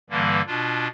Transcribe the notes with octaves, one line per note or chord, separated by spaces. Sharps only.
G2 D3 E3 G3 A#3
B2 D4 F4